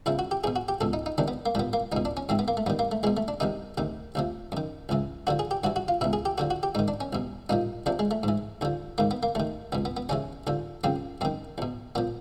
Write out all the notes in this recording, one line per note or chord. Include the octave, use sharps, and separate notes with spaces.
E2 C#3 F3 E4
F#4
G4
E2 B2 G#4
F#4
G4
C#2 B2 A4
D#4
D#4
E2 C3 D#3 D4
B3
A#3
C2 A#2 F3 B3
A#3
C#2 B2 D#4
D4
C#4
G#2 E3 C4
B3
A#3
A3
G2 D#3 B3
A#3
A3
E2 B2 G#3
A3
D4
C2 C3 D#3 D#4
D2 C3 D#3
D2 C3 F3
F#2 D#3
C#2 C#3 E3
D#2 D3 F3 F#4
G#4
G4
G2 E3 F#4
F#4
F4
C#2 B2 E4
G#4
G4
D#2 D3 F3 F#4
F#4
G4
G#2 D#3 D#4
D4
C#4
C2 B2
C2 A#2 F3 D#4
E2 C3 F3 D4
G#3
A3
G#2 E3
D#2 D3 F3
G#2 D#3 A#3
B3
A#3
D#2 D#3 A3
C#2 B2 B3
B3
B3
D#2 C#3 E3 C#4
D#2 D3 F3
F#2 C#3 F3 C4
F#2 D#3 C4
E2 B2
A#2 F3 B3